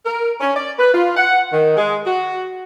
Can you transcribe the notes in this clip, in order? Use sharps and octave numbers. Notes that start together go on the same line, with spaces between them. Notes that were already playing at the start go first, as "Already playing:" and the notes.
A#4
C#4
D5
B4
F4
F#5
D#3
G#3
F#4